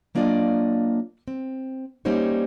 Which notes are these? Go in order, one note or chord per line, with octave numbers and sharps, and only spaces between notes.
F#3 A#3 D4 F4 D5 D#5
C4
G3 A#3 C#4 D#4 C5 C#5